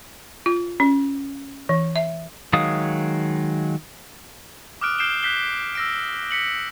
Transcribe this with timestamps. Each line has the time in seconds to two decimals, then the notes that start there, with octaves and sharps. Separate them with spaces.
0.46 F4
0.80 C#4
1.69 E3
1.96 E5
2.53 D#3 F#3 G#3 F5 D#6
4.81 D6 D#6 F6 F#6 D7
4.99 F6 G6 C7 D7 E7 G7
5.23 F#6 G6 B6 C7 G7
5.75 E6 A#6 D7
6.31 B6 C#7 F#7